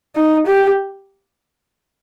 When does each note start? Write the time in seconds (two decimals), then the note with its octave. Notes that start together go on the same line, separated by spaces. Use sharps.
0.16 D#4
0.47 G4